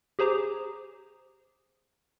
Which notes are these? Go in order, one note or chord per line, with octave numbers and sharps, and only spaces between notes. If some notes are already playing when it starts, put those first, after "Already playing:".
G4 G#4 C5 A#5 D6